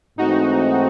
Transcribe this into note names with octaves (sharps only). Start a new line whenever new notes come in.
G#2 E3 A3 C4 D#4 F#4